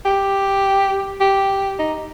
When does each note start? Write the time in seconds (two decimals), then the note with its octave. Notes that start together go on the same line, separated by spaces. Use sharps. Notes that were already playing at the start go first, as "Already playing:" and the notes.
0.05 G4
1.21 G4
1.79 D#4